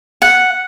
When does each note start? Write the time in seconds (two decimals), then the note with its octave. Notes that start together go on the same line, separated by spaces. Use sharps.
0.22 F#5